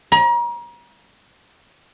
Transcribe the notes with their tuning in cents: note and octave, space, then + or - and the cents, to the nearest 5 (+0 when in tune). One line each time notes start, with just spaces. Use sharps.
A#5 +35